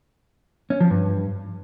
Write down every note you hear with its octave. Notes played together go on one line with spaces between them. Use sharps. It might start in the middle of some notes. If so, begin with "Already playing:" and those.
C#4
F3
G2